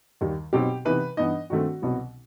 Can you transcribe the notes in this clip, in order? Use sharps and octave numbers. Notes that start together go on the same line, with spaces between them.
D#2 D#3 G3
B2 F#3 C4 D#4 G4
C3 E3 B3 D#4 B4
G2 E3 B3 D#4 D#5
G2 D#3 A3 C4 F#4
C2 B2 F#3 B3